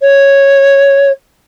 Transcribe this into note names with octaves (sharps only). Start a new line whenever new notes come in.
C#5